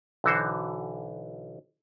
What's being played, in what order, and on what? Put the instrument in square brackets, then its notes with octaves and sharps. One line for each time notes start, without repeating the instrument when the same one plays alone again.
[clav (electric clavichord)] B1 D3 E3 F#4 C5